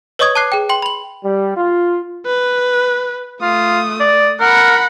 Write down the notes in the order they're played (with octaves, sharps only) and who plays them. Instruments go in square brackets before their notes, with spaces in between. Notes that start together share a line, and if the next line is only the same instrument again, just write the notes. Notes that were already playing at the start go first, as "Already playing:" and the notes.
[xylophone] B4 C#5 D#5 C#6 D#6 G#6
A5 D6 F#6 C7
G#4 G5
G5 C6 F#7
B5 F#7
[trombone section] G3
F4
[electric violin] B4
[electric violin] A3 D#6 [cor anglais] F4
[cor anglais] D5
[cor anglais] A#4 [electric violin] F#5 B5